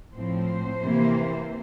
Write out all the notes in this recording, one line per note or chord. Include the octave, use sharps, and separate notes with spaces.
A2 F3 C4 C5
C3 E3 A#3